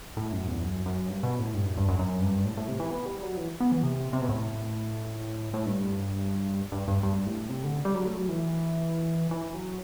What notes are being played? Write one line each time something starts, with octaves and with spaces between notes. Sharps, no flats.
A2
F#2
E2
F#2
F#2
G2
B2
A2
G2
F#2
G2
F#2
F#2
G2
A2
A2
C3
E3
B3
G3
F#3
E3
B3
E3
C3
C3
B2
A2
A2
G2
G2
G2
G2
A2
C3
D3
G3
F#3
A3
F#3
E3
E3
F#3